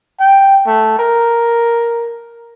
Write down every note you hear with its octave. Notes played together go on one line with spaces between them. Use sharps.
G5
A3
A#4